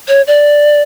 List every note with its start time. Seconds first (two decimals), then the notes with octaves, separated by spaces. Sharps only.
0.08 C#5
0.27 D5